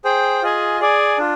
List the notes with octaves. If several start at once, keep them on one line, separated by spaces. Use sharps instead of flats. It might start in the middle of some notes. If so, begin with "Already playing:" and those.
G#4 C5 G5
F4 G#4 D#5 G#5
G#4 D5 G#5
D4 F4